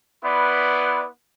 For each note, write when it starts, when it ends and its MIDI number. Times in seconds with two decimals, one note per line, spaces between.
0.24 1.05 59
0.24 1.05 64
0.24 1.05 71
0.24 1.05 74
0.24 1.05 84